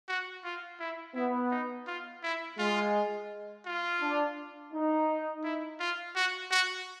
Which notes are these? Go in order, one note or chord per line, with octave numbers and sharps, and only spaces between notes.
F#4
F4
E4
B3 E4
D#4
F4
E4
G#3 F4
F4
D4
D#4
E4
F4
F#4
F#4